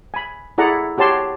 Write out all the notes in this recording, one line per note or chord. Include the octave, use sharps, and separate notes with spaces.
G#5 B5
E4 G#4 A4 D5 F#5 A#5
F#4 G4 C#5 A5 C6